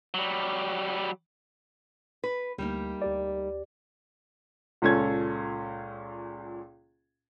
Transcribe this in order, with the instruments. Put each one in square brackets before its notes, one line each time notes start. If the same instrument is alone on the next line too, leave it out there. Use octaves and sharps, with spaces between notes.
[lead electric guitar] F#3 G3
[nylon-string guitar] B4
[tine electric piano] D2 [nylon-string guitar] G3 A#3 D#4
[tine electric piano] D2 G4 D5
[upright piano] C#2 A#2 C#4 A4 G#6